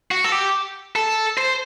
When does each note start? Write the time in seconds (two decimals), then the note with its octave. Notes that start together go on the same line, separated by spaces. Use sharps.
0.11 F#4
0.24 A4
0.32 G4
0.96 A4
1.37 C5